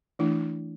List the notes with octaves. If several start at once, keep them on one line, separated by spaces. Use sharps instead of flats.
E3 A3 D4 E4